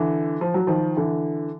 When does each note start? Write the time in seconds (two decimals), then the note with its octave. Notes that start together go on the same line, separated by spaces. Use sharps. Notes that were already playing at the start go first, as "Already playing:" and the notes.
Already playing: D3 E3
0.41 F3
0.54 F#3
0.67 D#3 F3
0.97 D3 E3